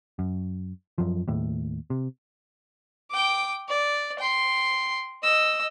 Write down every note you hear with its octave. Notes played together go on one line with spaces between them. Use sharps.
F#2
F#2 F3
D#2 A2
C3
G5 D6
D5
G5 C6
D#5 E6